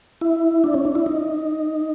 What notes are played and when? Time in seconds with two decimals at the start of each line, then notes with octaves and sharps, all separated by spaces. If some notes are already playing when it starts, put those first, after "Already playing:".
0.21 E4
0.64 D4
0.74 C#4
0.85 D4
0.95 E4
1.06 D#4